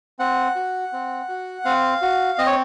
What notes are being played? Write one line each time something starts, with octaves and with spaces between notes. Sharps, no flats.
C4 F#5
F#4
C4
F#4
C4 F5
F#4
C4 D#5
C#5